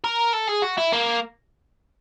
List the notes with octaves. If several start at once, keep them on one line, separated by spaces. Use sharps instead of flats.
A#4
A4
G#4
F#4
E4
A#3